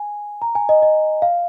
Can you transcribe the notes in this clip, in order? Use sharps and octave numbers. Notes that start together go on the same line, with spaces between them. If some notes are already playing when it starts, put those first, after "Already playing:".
Already playing: G#5
A#5
G#5
D#5
D#5
F5